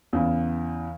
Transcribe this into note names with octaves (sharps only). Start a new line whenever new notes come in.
E2 C#3 E3